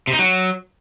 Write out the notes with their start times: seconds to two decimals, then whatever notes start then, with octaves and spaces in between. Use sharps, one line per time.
0.07 C3
0.13 D#4
0.19 F#3